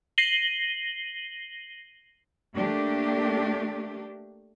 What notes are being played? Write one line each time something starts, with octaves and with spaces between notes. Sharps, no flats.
A#6 C7 D#7 F#7 G7
A3 A#3 D4 G4